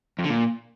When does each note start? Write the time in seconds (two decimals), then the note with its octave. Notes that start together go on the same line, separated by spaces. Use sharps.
0.19 F2
0.24 D3
0.30 A#2